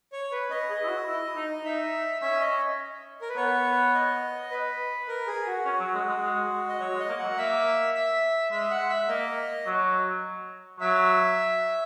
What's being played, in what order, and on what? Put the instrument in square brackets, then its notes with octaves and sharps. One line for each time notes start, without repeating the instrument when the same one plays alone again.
[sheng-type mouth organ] C#5
B4
[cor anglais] C#4 [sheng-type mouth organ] D#5
[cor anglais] G#4
E4
F#4
E4
D#4
[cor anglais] D#4 [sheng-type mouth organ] E5
[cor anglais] C#4 [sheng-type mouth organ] E5
[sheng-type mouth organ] D#5
A#4
B4
[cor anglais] B3 [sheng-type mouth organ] C#5
[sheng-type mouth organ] D#5
B4
A#4
G#4
F#4
[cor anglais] C#4
F#3
G#3
G#3
G#3
[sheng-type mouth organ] D#5
[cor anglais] F#3 [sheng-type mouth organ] C#5
[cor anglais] G#3
[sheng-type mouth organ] D#5
[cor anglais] A#3
[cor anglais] F#3 [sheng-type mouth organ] F#5
[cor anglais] A#3 [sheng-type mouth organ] E5
[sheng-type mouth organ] E5
[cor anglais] G#3 [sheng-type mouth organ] E5
[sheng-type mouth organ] F#5
E5
[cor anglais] A#3 [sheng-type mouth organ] D#5
[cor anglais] F#3
[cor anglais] F#3 [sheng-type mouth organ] E5